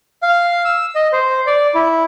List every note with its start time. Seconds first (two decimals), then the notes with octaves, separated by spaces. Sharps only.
0.23 F5
0.65 E6
0.95 D#5
1.12 C5
1.47 D5
1.75 E4